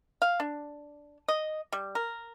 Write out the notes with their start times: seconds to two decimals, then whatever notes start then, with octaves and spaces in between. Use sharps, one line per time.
0.22 F5
0.40 D4
1.28 D#5
1.72 G3
1.95 A#4